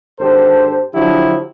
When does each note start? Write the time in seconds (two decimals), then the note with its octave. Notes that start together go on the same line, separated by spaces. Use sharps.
0.20 G#1 D4 G4 A4 C5
0.94 D3 F3 F#3 D4 E4 G4